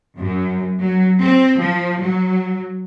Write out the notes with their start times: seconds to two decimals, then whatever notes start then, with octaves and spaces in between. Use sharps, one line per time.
0.18 F#2
0.81 F#3
1.21 C4
1.59 F3
2.01 F#3